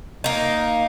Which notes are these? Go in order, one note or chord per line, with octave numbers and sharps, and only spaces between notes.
A#3 D#4